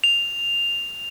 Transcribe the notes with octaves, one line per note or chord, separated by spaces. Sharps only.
F7